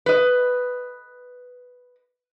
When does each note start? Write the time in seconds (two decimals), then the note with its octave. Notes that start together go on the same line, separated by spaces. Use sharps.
0.06 B4 D#5